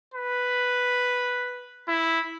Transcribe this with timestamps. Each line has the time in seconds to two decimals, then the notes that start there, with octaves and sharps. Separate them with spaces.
0.14 B4
1.88 E4